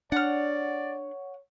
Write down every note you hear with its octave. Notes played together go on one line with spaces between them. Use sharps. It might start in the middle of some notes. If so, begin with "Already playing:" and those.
D4 C#5 D5 F#5 F6